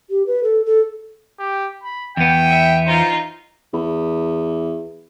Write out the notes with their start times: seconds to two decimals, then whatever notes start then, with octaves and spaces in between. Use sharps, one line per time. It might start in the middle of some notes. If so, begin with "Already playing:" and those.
0.10 G4
0.27 B4
0.43 A4
0.66 A4
1.39 G4
1.83 B5
2.17 E2 B3 G5
2.49 E5
2.87 D#4 F4 C5
3.74 E2